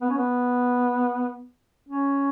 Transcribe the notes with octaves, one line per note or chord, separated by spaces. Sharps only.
B3
C#4
B3
C#4